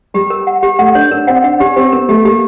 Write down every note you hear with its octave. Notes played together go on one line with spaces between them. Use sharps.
G3 G4
A#4
F#5
G4
A3 F#5
D4 C#5
D4 A#4
C4 F#5
D4 F#5
C#4 G4
C4 G4
B3 A#4
A3 G4
A#3 G4